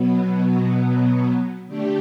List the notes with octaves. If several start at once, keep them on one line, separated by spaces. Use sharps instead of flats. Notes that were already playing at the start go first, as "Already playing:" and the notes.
Already playing: B2 F#3 B3
D3 A3 D4 G4